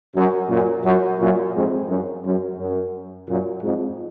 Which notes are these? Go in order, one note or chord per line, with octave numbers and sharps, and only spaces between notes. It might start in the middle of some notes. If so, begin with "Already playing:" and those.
F#2
F#2 A#2
F#2
F#2 A#2
F2 G#2
F#2
F#2
F#2
F#2 A#2
F2 G#2